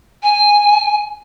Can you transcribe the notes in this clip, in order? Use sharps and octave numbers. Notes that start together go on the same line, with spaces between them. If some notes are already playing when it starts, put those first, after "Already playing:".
G#5